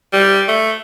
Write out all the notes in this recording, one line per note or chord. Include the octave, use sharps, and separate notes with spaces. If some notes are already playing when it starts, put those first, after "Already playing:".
G3
A3